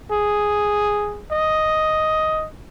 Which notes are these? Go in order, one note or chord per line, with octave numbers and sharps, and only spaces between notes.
G#4
D#5